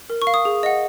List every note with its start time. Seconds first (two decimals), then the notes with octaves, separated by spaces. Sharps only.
0.10 A#4
0.22 C#6
0.27 F5
0.34 D#6
0.45 G#4
0.63 D#5 F#5